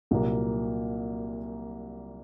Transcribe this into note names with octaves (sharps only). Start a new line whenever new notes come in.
C2 A#2 F#3 A#3